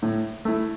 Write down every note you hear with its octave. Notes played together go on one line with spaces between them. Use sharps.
A2
A3 E4